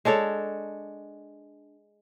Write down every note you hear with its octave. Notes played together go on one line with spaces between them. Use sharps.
G#3 D4 A4 C#5